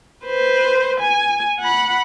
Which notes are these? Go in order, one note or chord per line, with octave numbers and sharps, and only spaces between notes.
B4 C5
G#5
F#5 B5